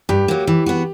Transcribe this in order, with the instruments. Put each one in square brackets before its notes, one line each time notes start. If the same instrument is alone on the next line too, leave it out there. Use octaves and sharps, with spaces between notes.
[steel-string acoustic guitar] G2 [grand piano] G4
[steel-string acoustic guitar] F#3 A#3
E3
B3 F#4